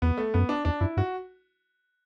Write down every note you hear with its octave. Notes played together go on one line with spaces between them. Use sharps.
E2 B3
A3
F#2 B3
D4
E2 D4
F#2 E4
G2 F#4